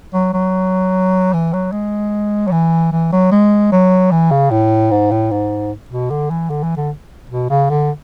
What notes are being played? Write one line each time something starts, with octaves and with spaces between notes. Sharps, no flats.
F#3
F#3
E3
F#3
G#3
F#3
E3
E3
F#3
G#3
F#3
E3
C#3
A2
G#2
A2
G#2
B2
D3
E3
D3
E3
D3
B2
C#3
D3